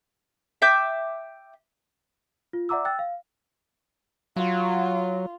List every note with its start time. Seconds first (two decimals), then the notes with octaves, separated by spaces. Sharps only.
0.62 E5 G5 D6 G6
2.53 F4
2.69 D5 E5 F#5 A#5 D6 E6
2.85 G5 E6 F#6 A6
2.99 F5
4.36 F#3 F4